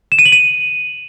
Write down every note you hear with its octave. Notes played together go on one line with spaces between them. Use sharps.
E7
D#7
F#7
D#7